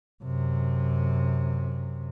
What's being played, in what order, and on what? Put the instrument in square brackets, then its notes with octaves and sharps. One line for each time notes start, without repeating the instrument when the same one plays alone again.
[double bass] F#2 C3